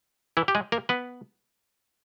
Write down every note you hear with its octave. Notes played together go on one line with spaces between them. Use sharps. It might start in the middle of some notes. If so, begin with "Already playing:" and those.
E3 E4
G4
G#3 G#4
A#3 A#4
B3 B4